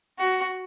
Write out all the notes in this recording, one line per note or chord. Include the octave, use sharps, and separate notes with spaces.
F#4